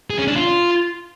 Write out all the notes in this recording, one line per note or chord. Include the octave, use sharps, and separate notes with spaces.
G#4
C#4
D4
F4